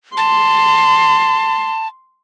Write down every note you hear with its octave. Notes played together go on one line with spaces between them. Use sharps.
A5 C6